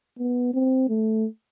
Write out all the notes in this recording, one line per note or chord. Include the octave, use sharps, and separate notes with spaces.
B3
C4
A3